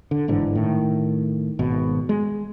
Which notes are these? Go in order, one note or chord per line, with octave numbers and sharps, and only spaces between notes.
D3
G1 G#2 D3 E3
A2 D#3
G#1 B2
G#3